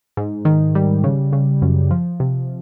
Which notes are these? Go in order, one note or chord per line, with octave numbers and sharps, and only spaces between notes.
G#2
D#3
G3
C#3
C#3
F#2
F3
C3